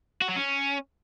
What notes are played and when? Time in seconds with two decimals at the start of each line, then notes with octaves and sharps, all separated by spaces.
0.22 F#4
0.29 F#3
0.36 C#4